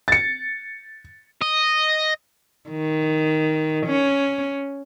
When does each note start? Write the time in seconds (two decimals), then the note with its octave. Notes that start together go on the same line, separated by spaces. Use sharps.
0.08 A6 C#7
1.42 D#5
2.70 D#3
3.87 C#4